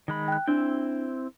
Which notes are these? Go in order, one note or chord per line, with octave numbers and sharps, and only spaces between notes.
D#3 G#3 B5
G5 F#6
C4 D4 E4 G5